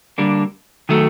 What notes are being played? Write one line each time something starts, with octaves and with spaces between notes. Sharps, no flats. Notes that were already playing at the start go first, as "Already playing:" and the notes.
D3 G3 A#3 D4
D#3 F#3 A3